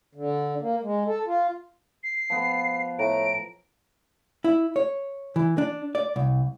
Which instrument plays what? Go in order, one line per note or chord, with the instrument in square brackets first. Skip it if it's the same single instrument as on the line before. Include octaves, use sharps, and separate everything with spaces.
[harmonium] D3
A#3
G#3
A4
F4
[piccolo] C7
[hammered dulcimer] F3 B3
[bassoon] A2 [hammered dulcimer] A#5 [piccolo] D7
[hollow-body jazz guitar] E4
C#5
E3
D4
D5
C2